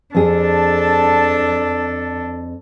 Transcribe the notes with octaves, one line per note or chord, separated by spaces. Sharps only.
F2 D4 G#4 A4